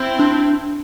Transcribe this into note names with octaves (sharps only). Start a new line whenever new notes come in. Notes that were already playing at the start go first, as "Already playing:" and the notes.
Already playing: C4 E4
D4